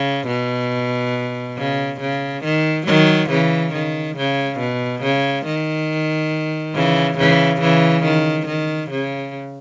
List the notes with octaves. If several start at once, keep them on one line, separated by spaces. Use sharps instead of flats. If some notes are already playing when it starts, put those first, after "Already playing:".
Already playing: C#3
B2
C#3
C#3
D#3
D#3 F#3
C#3 E3
D#3
C#3
B2
C#3
D#3
C#3 E3
C#3 E3
C#3 E3
D#3
D#3
C#3